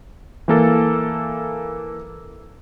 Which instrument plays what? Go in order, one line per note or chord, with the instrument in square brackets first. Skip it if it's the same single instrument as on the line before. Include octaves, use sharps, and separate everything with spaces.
[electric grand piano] E3 A#3 A4